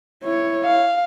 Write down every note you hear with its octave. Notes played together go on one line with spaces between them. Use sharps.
E4 C#5
F5